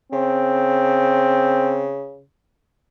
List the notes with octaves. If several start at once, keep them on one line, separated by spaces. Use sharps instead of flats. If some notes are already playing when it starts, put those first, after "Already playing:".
C#3 C4